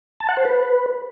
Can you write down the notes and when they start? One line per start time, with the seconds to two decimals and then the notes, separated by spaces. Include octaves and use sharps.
0.20 A5
0.29 F#5
0.37 C5
0.45 B4